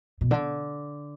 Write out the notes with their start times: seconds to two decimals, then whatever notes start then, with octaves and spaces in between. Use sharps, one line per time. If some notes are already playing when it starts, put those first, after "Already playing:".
0.21 B2
0.31 D3